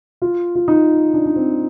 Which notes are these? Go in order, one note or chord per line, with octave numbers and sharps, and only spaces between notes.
F4
F4
D#4
D4
D4
C4